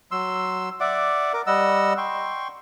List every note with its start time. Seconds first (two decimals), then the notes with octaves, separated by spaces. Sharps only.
0.11 F#3 C6 E6
0.80 D5 E5 F#5 D6
1.33 A#4 D6
1.47 G3 D#5 F#5 E6
1.98 G5 C6 C#6